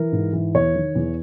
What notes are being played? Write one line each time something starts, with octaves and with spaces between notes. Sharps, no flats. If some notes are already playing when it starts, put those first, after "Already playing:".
Already playing: E3 A#4
G#2
E3
E2 C#5
D#3
E2